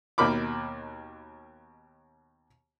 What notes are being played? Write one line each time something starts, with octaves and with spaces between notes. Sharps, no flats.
D#2 B2 A#4 B5 D6